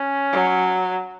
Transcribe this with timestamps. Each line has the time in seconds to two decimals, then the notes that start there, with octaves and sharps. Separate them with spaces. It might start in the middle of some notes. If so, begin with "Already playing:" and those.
Already playing: C#4
0.33 F#3